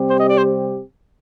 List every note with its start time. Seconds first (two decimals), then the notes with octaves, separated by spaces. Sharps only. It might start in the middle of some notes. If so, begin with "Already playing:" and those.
Already playing: C3 G3 C4 G4
0.10 C5
0.20 D#5
0.29 D5
0.38 C5